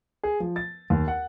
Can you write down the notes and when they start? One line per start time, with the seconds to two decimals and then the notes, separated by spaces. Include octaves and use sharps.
0.23 G#4
0.40 F3
0.56 A6
0.90 D#2
1.08 F#5